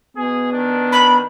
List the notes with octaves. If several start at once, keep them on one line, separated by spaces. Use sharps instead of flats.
B2 B3 G#4
D#3 D4
B5